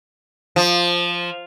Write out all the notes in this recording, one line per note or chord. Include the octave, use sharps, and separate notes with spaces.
F3